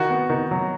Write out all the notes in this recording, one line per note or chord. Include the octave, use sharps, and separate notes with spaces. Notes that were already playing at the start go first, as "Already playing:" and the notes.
Already playing: D#3 F#4
B3
D#3
F#3